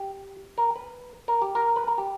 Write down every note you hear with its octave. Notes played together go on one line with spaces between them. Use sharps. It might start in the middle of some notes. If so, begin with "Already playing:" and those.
Already playing: G4
A#4
B4
A#4
G4
A#4
B4
A#4
G4